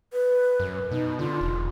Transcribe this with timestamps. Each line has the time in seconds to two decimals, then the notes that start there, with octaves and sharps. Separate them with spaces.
0.13 B4
0.60 F#2
0.91 B2 D#4
1.19 D3 F4
1.41 E1